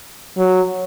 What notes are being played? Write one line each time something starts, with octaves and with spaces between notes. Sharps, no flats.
F#3